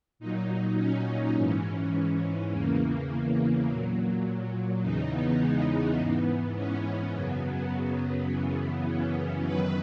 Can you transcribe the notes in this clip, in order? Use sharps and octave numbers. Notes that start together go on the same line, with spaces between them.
A#2 F#3 D#4
C#4
G#2 E3
C#4
E2 C#3 E3 A#3
A#2 F#3
E2 C#3 E3 D#4
B3
G#3
G#2 E3 B3
C#4
F#2 C#3 F#3 B3
F#2 C#3 E3 B3
C#4
F#2 D#3 F#3 B4